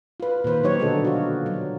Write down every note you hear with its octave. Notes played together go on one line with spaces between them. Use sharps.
F4 B4
A#2 D#3 B4 C5
F#3 D#4 G4 C#5
B2 D3 G3 D#4 F#4 A4
F4 F#4
F#3